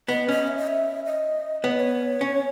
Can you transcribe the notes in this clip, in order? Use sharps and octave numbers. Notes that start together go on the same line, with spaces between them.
B3 D#5
C#4 D#5
E5
D#5
E5
D#5
B3 C#5
D#5
C#5
C#4